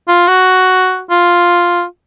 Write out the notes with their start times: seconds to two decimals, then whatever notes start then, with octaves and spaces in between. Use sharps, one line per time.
0.08 F4
0.28 F#4
1.10 F4